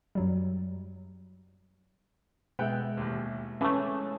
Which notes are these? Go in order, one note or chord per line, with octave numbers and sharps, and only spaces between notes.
F#2 F#3 G3
B2 G#3 B3 E5 G5 F#6
A1 D#2
E3 A3 C#4 G#4 B4 A5